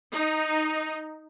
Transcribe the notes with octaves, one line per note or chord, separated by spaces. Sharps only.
D#4